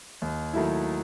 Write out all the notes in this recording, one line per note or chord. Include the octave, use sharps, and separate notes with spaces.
D#2
D#3 F#3 A3 E4